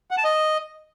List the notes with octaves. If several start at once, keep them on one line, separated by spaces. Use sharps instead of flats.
F#5
A5
D#5